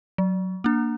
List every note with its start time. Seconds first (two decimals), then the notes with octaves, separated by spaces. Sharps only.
0.18 F#3
0.64 A#3 D4